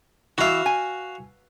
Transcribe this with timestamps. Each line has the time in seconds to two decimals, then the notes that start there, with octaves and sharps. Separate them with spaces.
0.38 E3 F#4 E5 F5
0.66 G#5